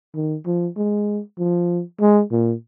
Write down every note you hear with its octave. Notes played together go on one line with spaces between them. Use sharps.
D#3
F3
G#3
F3
G#3
A#2